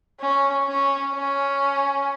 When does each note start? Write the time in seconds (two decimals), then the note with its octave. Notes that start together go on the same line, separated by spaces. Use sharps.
0.20 C#4
0.68 C#4
1.14 C#4